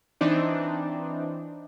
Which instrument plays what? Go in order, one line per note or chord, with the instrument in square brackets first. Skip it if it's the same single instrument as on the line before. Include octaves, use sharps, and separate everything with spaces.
[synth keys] E3 C4 D4 D#4